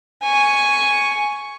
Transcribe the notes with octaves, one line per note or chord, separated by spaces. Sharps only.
G#5 C#6